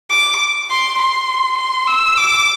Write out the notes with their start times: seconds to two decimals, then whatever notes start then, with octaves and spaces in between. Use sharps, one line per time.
0.10 D6
0.70 C6
0.99 C6
1.57 C6
1.87 E6
2.17 D6